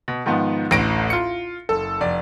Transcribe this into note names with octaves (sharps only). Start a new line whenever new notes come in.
B2
G#2 D#3 F3 B3
A1 D2 A2 A#6 D7
F4 C#7
F#1 A4
F1 D5